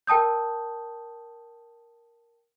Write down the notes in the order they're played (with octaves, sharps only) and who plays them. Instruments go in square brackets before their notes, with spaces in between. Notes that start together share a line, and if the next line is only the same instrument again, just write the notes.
[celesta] A#4 G5 A5 D#6 G6